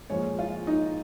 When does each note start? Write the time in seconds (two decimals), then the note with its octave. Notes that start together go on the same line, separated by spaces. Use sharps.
0.10 A#2 F3 G#3 C#5
0.39 F4
0.67 D#4